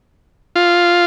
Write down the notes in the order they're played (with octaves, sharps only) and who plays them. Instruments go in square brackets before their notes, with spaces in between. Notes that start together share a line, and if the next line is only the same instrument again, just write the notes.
[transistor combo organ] F4